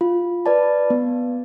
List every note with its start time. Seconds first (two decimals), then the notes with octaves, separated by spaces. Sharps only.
0.01 F4
0.46 B4 D5 A5
0.90 B3